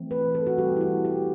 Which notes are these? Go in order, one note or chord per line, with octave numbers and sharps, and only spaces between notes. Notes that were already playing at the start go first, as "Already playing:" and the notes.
Already playing: E3 A3 C4
B4
A4
F#4
E3 G3 C4 G4
E4
F#4
G4